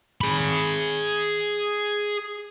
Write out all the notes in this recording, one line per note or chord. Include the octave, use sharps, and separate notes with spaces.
G#4 B5